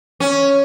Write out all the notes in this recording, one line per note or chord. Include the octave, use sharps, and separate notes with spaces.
C#4